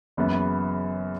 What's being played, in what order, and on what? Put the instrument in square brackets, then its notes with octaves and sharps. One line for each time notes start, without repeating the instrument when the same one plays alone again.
[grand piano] F#1 F#2 C#3 E3 B3